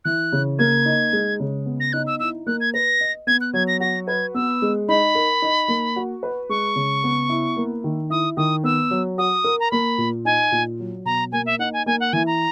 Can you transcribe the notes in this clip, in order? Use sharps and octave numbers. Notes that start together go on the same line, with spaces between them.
E3 F#6
C#3
A#3 G#6
D#4
G#3
C#3
B3
A#6
D#4 F#6
E6
E4 E6
A#3 F#6
G#6
B4 A#6
D#5
B3 G#6
F#6
F#3 G#6
A#6
F#4 A#6
B4 G#6
B3 E6
G#3
D#4 B5
A#4
D#4
A#3
F#4
B4
G#3 C#6
C#3
B3
E4
A#3
D#3
E4 D#6
D#3 D#6
B3 E6
F#3
F#4 D#6
A#4
A#5
A#3 B5
A#2
D#4 G#5
A#2
F#3
B2 A#5
A#3 G#5
E5
D#4 F#5
G#5
A#3 G#5
F#5
E3 G#5
A#5